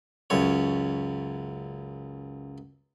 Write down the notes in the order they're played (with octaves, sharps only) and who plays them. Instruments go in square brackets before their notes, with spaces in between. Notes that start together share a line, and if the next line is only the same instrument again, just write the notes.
[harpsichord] C#2 F#2 C#5